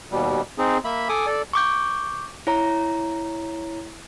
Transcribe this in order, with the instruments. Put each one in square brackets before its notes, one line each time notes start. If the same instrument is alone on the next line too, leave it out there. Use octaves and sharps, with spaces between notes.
[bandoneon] D#2 B2 G3
C4 D#4 G#4
A#3 E5 B5
A4 G#5 D6 D#6
A4 D5
[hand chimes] C#6 D6 G6
E4 C#5 A#5